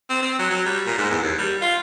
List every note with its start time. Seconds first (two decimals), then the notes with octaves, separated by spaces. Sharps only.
0.10 C4
0.23 C4
0.39 F#3
0.50 F#3
0.66 G3
0.86 A#2
0.98 G#2
1.10 E2
1.22 D#2
1.38 G3
1.61 F4